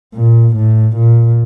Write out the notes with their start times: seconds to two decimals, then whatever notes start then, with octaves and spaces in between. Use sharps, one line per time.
0.15 A#2
0.56 A2
0.96 A#2